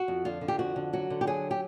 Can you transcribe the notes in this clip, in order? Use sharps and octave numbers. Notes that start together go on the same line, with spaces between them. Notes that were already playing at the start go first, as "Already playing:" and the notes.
Already playing: F#4
F2
D3 F4
D3
G4
F2 F#4
D3
F#3 F#4
D3
G4
F#3 G#4
G4